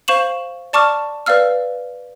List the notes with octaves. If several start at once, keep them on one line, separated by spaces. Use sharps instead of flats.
C5 F5 C#6 E7 F#7
D5 A5 C#6 D6 F6
B4 D5 F5 E6 F6